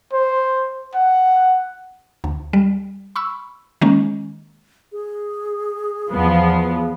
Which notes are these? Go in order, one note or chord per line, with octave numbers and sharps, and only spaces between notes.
C5
F#5
D2
G3
B5 C#6 E6
D#3 G#3 A#3 C#4
G#4
E2 F3 B3